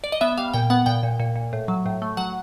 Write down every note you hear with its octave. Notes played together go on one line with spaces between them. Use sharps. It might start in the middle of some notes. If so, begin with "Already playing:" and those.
D5
D#5
B3 E5
G3 F5
A#2 G5
B3 F#5
A#2 G5
A#2
A#2
A#2
A2
F#3
A2
A3
F#3 F#5